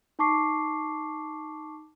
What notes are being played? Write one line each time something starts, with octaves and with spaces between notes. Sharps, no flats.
D#4 A5 C#6 D6 C7